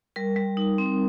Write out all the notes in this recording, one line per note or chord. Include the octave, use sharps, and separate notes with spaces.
G3 A#4
G3
D#4
C4